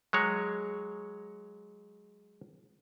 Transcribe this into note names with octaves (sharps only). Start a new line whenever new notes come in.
F#3 G#3 C#5